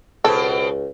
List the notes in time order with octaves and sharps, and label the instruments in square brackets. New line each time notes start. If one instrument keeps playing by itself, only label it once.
[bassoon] C#2 [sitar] B2 C4 [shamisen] A4